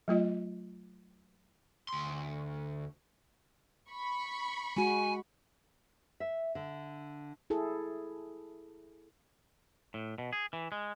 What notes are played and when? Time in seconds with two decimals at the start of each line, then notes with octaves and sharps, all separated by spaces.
0.08 F#3 A3 F4 D#5
1.89 D2 C6
3.91 B5 C#6
4.77 G#3 F#4 G#5
6.20 E5
6.55 D3
7.50 E4 G#4 A4
9.94 A2
10.18 B2
10.33 G#4
10.53 E3
10.72 G#3